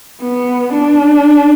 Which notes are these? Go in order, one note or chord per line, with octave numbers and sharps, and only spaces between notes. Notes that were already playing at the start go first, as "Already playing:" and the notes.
B3
D4